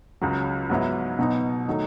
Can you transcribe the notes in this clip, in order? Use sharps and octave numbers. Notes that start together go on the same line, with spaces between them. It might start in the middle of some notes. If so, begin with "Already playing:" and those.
C#2 C#3 F#3
G#2 F#3 B3 E4
B2 F#3 B3 D#4
D#3 F#3 A3 D#4